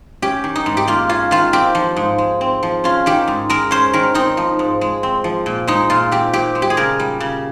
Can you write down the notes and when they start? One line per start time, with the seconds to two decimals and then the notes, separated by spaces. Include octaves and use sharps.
0.22 C#4 G4
0.44 D#3
0.56 D#4
0.66 G#2
0.77 G4
0.87 A#3 F4
1.09 C#4 F4
1.31 D#3 F4
1.53 C4 G4
1.75 F3
1.96 G#2
2.18 G#3
2.41 C4
2.63 F3
2.84 C#4 F4
3.06 D#3 G4
3.27 G#2
3.49 G#3 A#4
3.71 C#4 C5
3.93 D#3 A#4
4.14 C4 D#4
4.37 F3
4.59 G#2
4.81 G#3
5.03 C4
5.24 F3
5.46 A#2
5.67 G#3 D#4
5.90 A#2 F4
6.12 C4 G4
6.33 A#2 G4
6.55 G#3
6.62 G4
6.70 G#4
6.77 C#3 A#4
6.99 G3
7.20 C#3